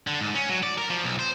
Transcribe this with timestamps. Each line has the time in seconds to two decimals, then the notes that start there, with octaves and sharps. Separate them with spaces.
0.07 D3
0.21 G#2
0.34 C#4
0.49 F#3
0.63 D5
0.78 A#4
0.90 F3
1.04 B1
1.19 C5